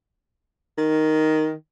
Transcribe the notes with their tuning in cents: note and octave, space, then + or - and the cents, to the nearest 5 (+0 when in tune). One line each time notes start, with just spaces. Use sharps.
D#3 +0